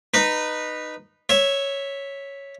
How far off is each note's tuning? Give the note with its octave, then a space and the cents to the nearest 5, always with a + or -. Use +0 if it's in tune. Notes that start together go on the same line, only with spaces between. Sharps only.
D#4 -15 B4 -5
C#5 +0 E5 -5